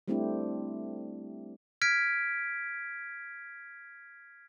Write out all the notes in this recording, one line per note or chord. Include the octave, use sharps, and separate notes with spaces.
G3 A3 C4 D4 E4 G4
F6 G#6 B6 D7